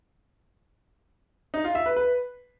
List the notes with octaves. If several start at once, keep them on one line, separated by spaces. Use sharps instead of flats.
D#4
F4
E5
B4
B4